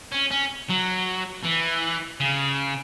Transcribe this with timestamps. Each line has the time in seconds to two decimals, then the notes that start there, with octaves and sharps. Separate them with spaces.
0.12 C#4
0.31 C#4
0.69 F#3
1.45 E3
2.20 C#3